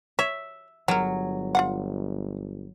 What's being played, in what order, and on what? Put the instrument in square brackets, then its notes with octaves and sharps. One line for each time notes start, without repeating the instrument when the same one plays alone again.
[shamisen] C#5 [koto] E5
[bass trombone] G1 [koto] F#3 [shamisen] G#3 A#4
[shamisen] F4 F5 F#5